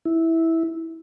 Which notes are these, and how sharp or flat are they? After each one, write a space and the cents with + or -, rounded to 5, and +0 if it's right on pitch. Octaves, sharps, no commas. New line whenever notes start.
E4 -10